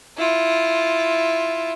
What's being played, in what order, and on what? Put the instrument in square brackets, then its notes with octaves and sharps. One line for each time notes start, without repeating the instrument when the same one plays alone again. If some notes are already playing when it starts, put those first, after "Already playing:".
[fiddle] E4 F4